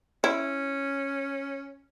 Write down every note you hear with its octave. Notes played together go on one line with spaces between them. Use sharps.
C#4 E4